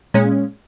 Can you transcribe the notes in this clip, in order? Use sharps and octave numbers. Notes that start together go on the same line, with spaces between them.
A#2 G#3 C#4